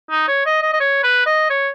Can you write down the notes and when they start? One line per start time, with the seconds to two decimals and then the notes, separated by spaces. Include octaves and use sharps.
0.10 D#4
0.28 C#5
0.46 D#5
0.62 D#5
0.73 D#5
0.80 C#5
1.03 B4
1.26 D#5
1.50 C#5